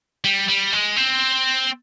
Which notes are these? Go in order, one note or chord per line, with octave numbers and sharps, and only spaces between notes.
G3
G3
G#3
C4